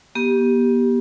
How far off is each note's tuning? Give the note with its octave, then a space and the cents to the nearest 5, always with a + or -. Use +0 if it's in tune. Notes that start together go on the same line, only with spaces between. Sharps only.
B3 -45 G4 +0